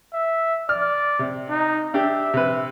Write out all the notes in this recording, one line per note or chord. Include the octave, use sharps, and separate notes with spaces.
E5
D5 F6
C3
D#4
D4 G4 E5
C3 B4